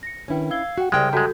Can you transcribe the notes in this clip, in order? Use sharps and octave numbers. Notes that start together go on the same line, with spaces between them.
A#6 C#7
D#3 C#4 D4 E4 B4 G5
F5 E6 G#6 G7
F#4 F#5 G5
C2 C#3 G3 G#3 G5 F6
F#2 G#3 F#4 A4 G6